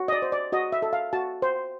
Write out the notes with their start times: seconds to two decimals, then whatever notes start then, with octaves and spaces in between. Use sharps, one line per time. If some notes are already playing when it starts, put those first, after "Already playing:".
Already playing: F#4
0.08 D#5
0.12 D5
0.22 C5
0.32 D5
0.52 F#4 D#5
0.72 E5
0.82 A4
0.93 F5
1.13 F#4 A5
1.42 C5